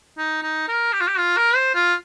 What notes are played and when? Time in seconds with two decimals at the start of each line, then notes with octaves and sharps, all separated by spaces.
0.18 D#4
0.43 D#4
0.68 A#4
0.93 G4
1.01 F4
1.08 G4
1.18 F4
1.37 A#4
1.56 C5
1.74 F4